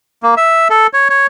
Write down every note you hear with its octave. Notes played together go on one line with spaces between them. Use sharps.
A#3
E5
A4
C#5
C#5